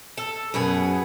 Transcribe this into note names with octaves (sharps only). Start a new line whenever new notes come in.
A4
F#2 B2 B3 G#4